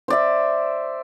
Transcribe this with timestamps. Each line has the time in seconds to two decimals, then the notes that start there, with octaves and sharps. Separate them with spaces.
0.08 C5 D5 E5